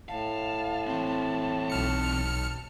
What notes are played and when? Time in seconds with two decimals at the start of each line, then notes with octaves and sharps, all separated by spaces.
0.09 A2 F5 A5
0.87 E3 C4
1.70 B1 F6 C#7